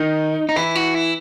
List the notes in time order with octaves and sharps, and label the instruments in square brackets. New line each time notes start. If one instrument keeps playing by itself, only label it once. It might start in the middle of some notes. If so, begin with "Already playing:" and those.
Already playing: [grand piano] D#3 [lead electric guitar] D#4
[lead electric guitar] D#4
[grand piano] E3 [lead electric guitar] E4
[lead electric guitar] F#4
E4